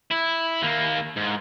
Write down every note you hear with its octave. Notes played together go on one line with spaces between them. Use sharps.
E4
D#2 A#3
G#2